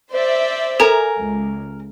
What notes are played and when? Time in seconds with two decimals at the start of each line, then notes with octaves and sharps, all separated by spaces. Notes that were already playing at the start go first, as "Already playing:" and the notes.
0.13 C5 D5 E5
0.80 A4 A#4 G#5 A#5
1.20 C#2